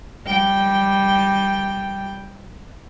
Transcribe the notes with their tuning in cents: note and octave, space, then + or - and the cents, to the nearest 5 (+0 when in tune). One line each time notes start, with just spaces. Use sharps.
G3 +0 G5 +0